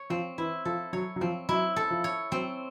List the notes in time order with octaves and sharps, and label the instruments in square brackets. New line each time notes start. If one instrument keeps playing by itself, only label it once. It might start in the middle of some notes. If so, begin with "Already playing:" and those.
Already playing: [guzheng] C#5
[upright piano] F3 [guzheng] C4
[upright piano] E3 [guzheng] E4
[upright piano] F3 [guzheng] A4
[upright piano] F#3 [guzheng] C#5
[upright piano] F#3
[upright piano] F3 [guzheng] C4
[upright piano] F#3 [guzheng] E4
[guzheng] A4
[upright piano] F3
[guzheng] C#5
[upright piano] F#3 [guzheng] C4